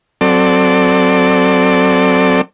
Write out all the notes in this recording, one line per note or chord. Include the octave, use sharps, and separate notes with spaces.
F#3 C4 A4 D5